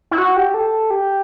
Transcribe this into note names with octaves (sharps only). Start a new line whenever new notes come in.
E4
F#4
G4
A4
G4